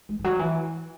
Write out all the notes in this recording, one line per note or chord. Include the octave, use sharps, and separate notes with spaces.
G#3
E3
F#3
E3